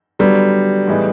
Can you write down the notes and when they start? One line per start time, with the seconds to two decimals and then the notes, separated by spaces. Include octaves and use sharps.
0.19 D3 F#3 G3 B3
0.87 A2 E3 G#3 B3 D#4